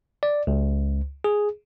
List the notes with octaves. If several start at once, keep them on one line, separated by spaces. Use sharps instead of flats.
D5
C#2
G#4